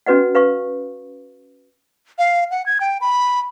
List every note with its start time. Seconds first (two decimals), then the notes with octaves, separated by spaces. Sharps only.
0.06 C#4 F#4 B4 D#5 F#5
0.35 B4 F5 C#6
2.19 F5
2.51 F#5
2.66 G#6
2.81 G5
3.01 B5